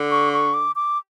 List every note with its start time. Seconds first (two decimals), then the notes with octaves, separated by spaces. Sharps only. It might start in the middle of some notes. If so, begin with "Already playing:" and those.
Already playing: D3
0.11 C#6
0.33 C#6
0.54 D6
0.76 D6